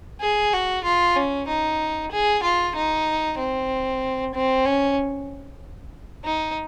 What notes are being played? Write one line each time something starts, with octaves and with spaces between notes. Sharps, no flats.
G#4
F#4
F4
C#4
D#4
G#4
F4
D#4
C4
C4
C#4
D#4